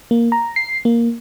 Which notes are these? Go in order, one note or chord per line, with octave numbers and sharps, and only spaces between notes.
A#3
A#5
C7
A#3